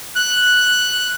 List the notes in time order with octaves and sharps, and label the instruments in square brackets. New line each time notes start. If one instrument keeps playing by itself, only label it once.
[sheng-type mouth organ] F#6